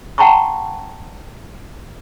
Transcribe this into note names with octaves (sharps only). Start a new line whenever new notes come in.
F#5 G5 A5 A#5 C6 C#6